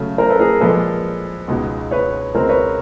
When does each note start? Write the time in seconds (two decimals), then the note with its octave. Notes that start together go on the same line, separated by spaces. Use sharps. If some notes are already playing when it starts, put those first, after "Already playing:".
Already playing: C#3 F#3 A3
0.18 A#4 C5
0.28 A4 B4
0.39 G#4 A#4
0.61 A#2 F3 G#3 A4 B4
1.48 C#2 B2 G#3 B3 D#4
1.91 B4 C#5
2.34 C#2 B2 G#3 C4 A#4 C5
2.49 B4 C#5